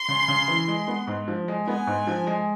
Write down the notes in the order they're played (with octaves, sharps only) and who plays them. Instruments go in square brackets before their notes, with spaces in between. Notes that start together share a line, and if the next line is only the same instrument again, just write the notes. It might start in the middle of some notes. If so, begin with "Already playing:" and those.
Already playing: [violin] C6
[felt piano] C#3
C#3
E3
G#3
B3
G#2
F3
G#3
[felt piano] B3 [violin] G#5
[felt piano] G#2
F3
G#3